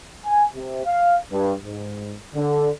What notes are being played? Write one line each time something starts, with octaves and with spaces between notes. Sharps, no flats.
G#5
C3
F5
G2
G#2
D3